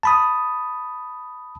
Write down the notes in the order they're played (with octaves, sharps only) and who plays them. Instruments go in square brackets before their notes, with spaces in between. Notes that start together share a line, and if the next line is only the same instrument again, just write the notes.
[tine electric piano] A5 B5 D#6